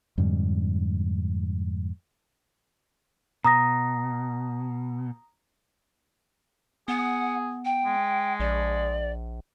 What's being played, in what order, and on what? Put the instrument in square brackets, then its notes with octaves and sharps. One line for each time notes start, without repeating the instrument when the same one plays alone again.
[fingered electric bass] F2 G#2 D3 G3
[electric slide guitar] B2 [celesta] A#5 D#6 A#6
[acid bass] B3 [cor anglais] G#4 [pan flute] F#5
[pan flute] G5
[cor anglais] G#3
[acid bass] A#1 [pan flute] D5